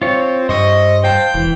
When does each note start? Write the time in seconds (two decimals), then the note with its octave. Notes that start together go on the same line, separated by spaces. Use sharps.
0.02 C4 F4 C#5
0.49 G2 C5 D#5 C#6 E6
1.04 C5 F5 G5 A5
1.34 E1 E3